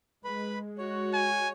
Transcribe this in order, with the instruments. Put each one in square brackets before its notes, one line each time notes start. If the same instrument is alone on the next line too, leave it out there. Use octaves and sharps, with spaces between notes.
[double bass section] G#3 [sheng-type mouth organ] B4 B5
[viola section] F#4 [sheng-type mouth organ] C#5
[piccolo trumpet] G#5